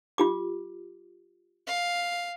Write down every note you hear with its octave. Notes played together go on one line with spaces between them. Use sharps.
F4 G4 D6
F5